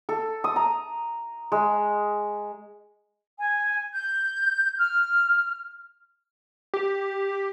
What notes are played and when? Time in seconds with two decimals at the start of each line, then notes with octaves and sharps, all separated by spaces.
0.09 A4
0.44 D#6
0.56 A#5
1.52 G#3
3.39 G#5
3.95 G6
4.78 F6
6.74 G4